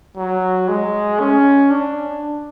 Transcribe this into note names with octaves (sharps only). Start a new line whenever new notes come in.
F#3
G#3
C#4
D4